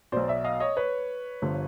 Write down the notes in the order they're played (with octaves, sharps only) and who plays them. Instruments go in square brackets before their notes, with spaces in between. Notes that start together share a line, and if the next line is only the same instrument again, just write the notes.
[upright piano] B1 B2 C5 D5
D5 E5
D#5 F5
C#5 D#5
B4 C#5
G1 G2 D3 F3